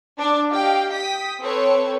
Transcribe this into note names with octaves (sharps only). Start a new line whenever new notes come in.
D4 D5 A5
G4 D#5 F5 G5
G5 D#6 B6
C4 A4 B4 C#5